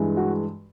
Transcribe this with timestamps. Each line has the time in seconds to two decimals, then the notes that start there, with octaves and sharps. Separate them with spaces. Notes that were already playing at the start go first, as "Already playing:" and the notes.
Already playing: G2 E3 G#3
0.17 F#4